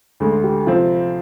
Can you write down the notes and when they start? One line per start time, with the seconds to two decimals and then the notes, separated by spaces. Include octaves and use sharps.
0.20 D2 D3 G#3
0.44 G4
0.66 C3 F3 C4 F4